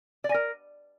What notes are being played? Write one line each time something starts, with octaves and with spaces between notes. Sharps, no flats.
D5
G#5
A#4